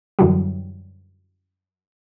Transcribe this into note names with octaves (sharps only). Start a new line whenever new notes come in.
F#2 D3 E3 F#3 G3